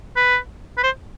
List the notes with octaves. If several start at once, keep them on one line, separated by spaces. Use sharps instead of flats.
B4
B4
C5